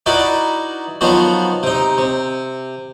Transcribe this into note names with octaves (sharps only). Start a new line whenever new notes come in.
D#4 E4 F#4 B4 D5
D#3 F3 F#3 B3 F#4
C3 D#4
C3